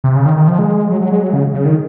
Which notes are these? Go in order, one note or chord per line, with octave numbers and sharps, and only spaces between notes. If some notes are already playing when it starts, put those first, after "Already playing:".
C3
C#3
D#3
D#3
F3
G#3
F#3
F#3
G#3
F#3
C#3
C#3
D#3